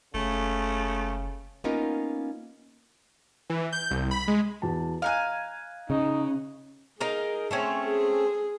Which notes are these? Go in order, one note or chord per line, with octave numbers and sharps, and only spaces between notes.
F#1 C#3 A3
A#3 B3 C#4 D#4 F4 A#4
E3
G6
C2
B5
G#3
E2 F#4 A5
D#5 F5 F#5 G#5 A#5 F#6
C#3 D#4
D#4 G#4 A#4 F5
A3 C4 C#4
G#4